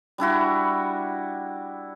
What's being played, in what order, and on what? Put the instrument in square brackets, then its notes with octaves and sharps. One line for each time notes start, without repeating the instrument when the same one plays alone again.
[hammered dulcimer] G3 D4 E4 F#4